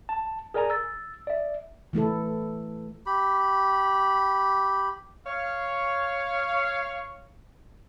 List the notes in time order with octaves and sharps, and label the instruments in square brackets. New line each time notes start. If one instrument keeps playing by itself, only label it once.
[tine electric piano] A5
G#4 A#4 D5 G#5 A#5
E6 A6
D5 E5
[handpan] E3 A3 E4 A4
[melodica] G4 B5
[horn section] C#5 F5